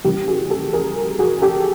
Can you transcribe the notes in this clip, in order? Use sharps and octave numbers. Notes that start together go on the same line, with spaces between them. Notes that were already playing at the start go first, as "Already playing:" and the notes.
C#3 E3 G3 A#3 G4
F#4 G#4
G4 A4
G#4 A#4
F#4 G#4
G4 A4